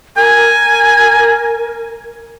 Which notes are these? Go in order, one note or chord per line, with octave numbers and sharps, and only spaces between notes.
A#4 G#5